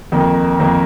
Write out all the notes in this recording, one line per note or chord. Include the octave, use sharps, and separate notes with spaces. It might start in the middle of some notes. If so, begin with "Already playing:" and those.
F2 D#3 A#3
F2 D#3 A#3